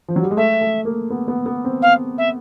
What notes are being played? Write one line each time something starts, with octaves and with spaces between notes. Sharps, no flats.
F3
F#3
G3
G#3
A3 E5
A3
A#3
B3
B3
B3
C4
F5
E5